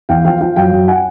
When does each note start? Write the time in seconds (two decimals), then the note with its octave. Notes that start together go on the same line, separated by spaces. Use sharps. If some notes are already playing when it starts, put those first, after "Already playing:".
0.09 E2 F5 G5
0.25 F3 F5 G5
0.40 F3 F5 G5
0.56 F#2 F5 G5
0.72 F#2
0.88 F#5 G#5